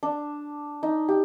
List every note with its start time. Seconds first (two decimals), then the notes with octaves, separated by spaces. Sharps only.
0.03 D4
0.83 D#4
1.08 G4